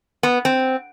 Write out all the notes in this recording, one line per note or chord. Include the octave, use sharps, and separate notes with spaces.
B3
C4